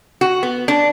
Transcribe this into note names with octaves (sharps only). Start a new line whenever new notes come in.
F#4
B3
D4